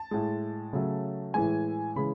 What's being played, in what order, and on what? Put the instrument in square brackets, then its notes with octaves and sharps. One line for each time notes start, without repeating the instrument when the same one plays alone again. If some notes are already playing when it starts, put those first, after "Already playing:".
Already playing: [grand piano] A5
A2 G#3
C#3 F#3 A3
A2 E3 G#3 G#5
C#3 E3 G#3 B5